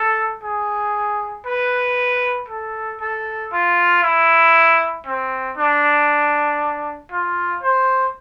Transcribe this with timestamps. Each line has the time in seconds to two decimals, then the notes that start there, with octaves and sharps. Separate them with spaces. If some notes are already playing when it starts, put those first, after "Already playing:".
Already playing: A4
0.43 G#4
1.46 B4
2.48 A4
3.01 A4
3.52 F4
4.03 E4
5.06 C4
5.57 D4
7.11 F4
7.62 C5